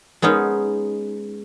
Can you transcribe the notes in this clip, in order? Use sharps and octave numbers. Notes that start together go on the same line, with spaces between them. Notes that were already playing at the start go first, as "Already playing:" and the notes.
G#3 B3 C#4 D#4